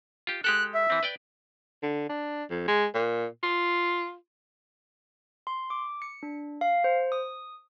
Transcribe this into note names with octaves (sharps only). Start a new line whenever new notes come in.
F4 G4
G#3 G4 A4 F#6
E5
E3 C4
B4 D5 G5
D3
D4
F2
G#3
A#2
F4
C6
D6
C#7
D4
F5
C5
D#6